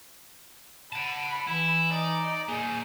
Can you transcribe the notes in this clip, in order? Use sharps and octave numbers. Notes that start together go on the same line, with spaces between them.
F#5 A5 B5
E3 E4
D#4 D5
A#2 D#4 G#4